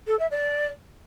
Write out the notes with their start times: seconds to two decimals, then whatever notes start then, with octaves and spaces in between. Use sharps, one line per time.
0.07 A4
0.19 E5
0.31 D5